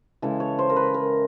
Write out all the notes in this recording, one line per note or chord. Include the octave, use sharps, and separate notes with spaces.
C#3 E3 G#3 A4
C#5
C5
A#4
B4
A#4